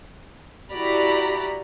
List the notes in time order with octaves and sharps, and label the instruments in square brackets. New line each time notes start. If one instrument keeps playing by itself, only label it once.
[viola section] E4 F#4 G4 D5 A#5 B5